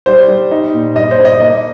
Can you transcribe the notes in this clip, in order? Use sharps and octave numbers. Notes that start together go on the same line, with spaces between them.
G3 C5
G3
D#4
A#2
G2 D#5
C5
G2
D#5
A#3 D#5